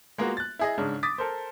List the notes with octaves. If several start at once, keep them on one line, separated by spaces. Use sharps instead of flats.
G#3 A#3 B3 F4 F#4
F#6 A6
E4 G#4 D#5
G#2 C#3 D4
D6 D#6 A6 B6
A4 A#4 C5